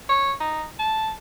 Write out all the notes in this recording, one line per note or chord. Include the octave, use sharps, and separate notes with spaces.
C#5
D#4
A5